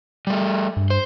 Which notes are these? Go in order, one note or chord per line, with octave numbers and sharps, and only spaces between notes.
G3 A3
G2
C5